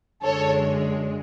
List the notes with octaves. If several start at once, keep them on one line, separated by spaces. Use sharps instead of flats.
F#2 D3 G#3 A4 C#5